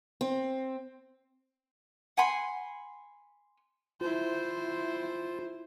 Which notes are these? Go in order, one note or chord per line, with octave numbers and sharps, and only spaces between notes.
C4
F#5 G#5 B5 C6
E4 F4 C5